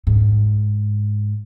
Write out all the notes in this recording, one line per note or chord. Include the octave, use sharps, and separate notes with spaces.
G#2